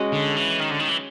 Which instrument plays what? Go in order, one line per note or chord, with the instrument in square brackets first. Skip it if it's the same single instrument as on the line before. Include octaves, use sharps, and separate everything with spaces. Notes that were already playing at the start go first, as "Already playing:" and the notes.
Already playing: [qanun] G#3 C#4 F#4
[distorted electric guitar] D3
E3
D#3
D3
D#3
E3